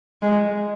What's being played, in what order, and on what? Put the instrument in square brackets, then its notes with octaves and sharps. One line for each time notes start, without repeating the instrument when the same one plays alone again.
[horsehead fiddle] G#3